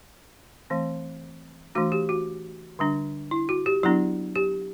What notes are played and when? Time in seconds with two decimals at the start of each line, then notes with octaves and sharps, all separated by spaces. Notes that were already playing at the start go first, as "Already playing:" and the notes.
0.70 E3 A3 C4
1.75 E3 A3 D4 F#4
1.92 G4
2.09 F#4
2.79 D3 G3 D4
3.31 E4
3.49 F#4
3.66 G4
3.83 F#3 B3 D4 E4
4.36 G4